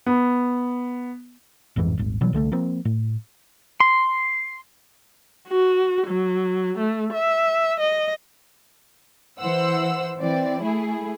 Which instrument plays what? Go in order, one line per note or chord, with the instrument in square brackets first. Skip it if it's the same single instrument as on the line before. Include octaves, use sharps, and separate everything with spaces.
[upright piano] B3
[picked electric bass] A1 F2 G#2 E3
D#1 G#1
B2 E3 F#3 G3
C2 D3 G#3 A3
F3 A#3 C4
A2
[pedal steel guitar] C6
[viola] F#4
F#3
A3
E5
D#5
[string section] E3 C5 F#5 E6
E3 C4 D5
A3 E4 G#4